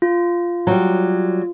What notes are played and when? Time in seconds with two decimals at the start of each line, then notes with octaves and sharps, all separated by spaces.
0.02 F4
0.67 F#3 G3